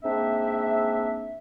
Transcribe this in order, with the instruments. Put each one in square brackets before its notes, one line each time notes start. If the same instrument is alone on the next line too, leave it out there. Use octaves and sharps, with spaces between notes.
[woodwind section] G#2 A#3 C4 D4 E5